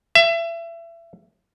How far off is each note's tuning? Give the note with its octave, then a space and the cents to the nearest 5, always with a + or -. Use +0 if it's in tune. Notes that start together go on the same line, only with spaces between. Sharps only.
E5 +30